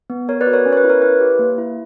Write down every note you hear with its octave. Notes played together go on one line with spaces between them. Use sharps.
B3
B3 A#4 C#5
B4 D5
F#4
A#4 C#5
C#4
C#5
B4
E4
A#4 C#5
E4 B4
G4
A#3
E4